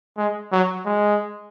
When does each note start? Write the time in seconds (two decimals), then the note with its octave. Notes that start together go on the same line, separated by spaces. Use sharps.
0.17 G#3
0.52 F#3
0.85 G#3